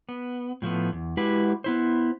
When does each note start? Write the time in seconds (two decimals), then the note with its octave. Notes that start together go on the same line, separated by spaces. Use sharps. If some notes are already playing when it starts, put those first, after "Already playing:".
0.09 B3
0.62 A2 F3 A3 B3
0.92 E2
1.17 G#3 E4 F#4 G4 B4
1.64 B3 E4 C5